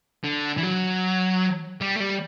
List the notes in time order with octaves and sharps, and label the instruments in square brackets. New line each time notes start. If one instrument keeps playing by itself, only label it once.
[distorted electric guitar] D3
E3
F#3
G3
A3
G3